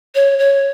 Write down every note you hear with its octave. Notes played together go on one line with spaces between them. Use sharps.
C#5
C#5